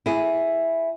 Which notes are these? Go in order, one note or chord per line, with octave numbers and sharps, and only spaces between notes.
E4 G#4